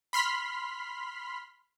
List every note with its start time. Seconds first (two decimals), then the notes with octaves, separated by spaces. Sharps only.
0.13 B5 C6 F6 B6